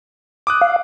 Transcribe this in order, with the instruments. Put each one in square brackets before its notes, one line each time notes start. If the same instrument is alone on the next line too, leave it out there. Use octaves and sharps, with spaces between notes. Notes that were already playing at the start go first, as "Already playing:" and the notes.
[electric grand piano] D6 D#6 F#6
[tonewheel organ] F5